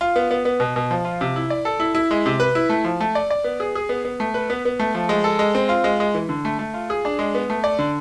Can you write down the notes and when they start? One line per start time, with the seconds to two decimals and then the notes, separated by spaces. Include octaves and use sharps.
0.01 F4
0.16 B3
0.31 B3
0.45 B3
0.60 B2
0.76 B2
0.91 F3
1.05 F4
1.21 C3
1.36 E4
1.50 D5
1.65 A4
1.80 E4
1.95 E4
2.11 G#3
2.26 C3
2.40 B4
2.55 E4
2.69 A3
2.85 F3
3.01 A3
3.15 D5
3.30 D5
3.44 B3
3.60 G#4
3.75 G#4
3.89 B3
4.05 B3
4.20 A3
4.34 B4
4.50 B3
4.65 B3
4.79 A3
4.95 F3
5.09 G#3
5.24 A4
5.39 G#3
5.55 C4
5.69 F4
5.84 G#3
6.00 G#3
6.14 E3
6.29 D3
6.45 A3
6.59 A3
6.74 F4
6.90 G#4
7.05 D4
7.19 G#3
7.35 B3
7.50 A3
7.64 D5
7.79 D3